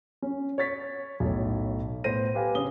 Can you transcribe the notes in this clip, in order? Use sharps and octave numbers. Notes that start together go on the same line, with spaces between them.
C#4
C#5 C#6 A6 B6
B1 A2
A2 B3 C5 A#6 D#7
G4 B4 F5 G#5
C#3 C#4 D#6 G7